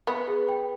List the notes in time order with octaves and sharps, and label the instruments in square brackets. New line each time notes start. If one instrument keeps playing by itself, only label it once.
[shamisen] B3 [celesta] B5
[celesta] G#4
G5